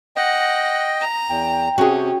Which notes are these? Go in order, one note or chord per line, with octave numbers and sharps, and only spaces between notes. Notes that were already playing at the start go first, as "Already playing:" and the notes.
D#5 F#5 G5 A#6
A#5
E2 G5
C3 C#4 F#4 G#4